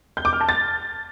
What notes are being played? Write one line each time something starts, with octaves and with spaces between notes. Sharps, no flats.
G6
D6
F6
A5
A6